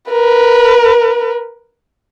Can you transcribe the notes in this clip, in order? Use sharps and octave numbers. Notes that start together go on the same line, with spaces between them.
A#4 B4